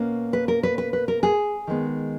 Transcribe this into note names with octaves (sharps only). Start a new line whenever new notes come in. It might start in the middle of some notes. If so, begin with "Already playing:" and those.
Already playing: B2 A#3 C#4
B4
A#4
B4
B4
B4
A#4
G#4
D#3 G#3 B3